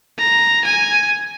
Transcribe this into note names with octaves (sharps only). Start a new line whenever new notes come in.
A#5
G#5